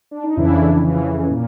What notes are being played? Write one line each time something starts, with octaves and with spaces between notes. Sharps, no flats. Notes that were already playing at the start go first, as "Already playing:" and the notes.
D4
D#4
F2 C#3 E3 D4 E4
F2 C#3 E3
A#2